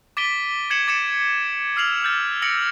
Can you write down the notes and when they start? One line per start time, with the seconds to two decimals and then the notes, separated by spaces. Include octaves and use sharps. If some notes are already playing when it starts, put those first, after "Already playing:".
0.17 D6 A6 B6 D7 D#7 G7
0.70 G#6 A6 C#7 E7 F#7
0.88 D6 A6 C#7 D7 E7
1.76 D6 E6 F6 C7 F7 F#7
2.02 E6 F6 G6 A6
2.42 E6 A#6 C#7 D7 F#7